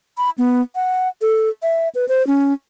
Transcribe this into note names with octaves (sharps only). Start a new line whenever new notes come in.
B5
B3
F#5
A4
E5
B4
C5
C#4